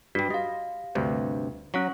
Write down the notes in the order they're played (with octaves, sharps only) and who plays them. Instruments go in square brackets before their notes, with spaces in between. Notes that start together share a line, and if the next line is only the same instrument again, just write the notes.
[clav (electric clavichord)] G2 G3 [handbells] F#4
[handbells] G4 F5 [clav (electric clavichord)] D#5
[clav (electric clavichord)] D2 G2 C3
[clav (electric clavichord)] F#3 [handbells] C#4 F#5 C#6